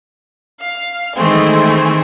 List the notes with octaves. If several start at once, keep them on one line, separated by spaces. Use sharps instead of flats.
F5
D#3 E3 G#3 A3 C4 G#4